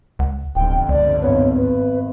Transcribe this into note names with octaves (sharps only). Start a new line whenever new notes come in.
C#2 F#5
D1 G1 F2 D3 G5
C#2 D5
G#1 B3 C#5
B4